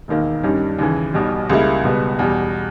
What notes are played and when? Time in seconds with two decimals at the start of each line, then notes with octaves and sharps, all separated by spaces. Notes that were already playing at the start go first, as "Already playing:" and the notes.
0.08 E1 D#2 D#3 A#3
0.43 G2 D#3 G3 C#4
0.79 D#2 C#3 E3
1.14 B1 B2 G3
1.50 C#2 C#3 G3 A#3 E4
1.83 C#2 B2 G3 B3
2.19 E2 B2 G3